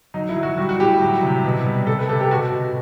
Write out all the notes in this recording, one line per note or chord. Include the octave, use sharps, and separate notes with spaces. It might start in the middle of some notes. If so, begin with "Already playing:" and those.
F#3 D#4
E4
F#3
F#4
G3 F#4
F#4
A2 G4
F#3
C3
B2
G3
C3 A4
B4
C3 A4
G4
B2 F#4
B2